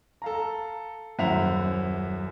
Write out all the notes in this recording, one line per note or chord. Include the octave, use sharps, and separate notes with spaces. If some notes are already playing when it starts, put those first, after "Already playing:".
A4 F5 A#5
D#1 F#2 E4 C5 F#5 F7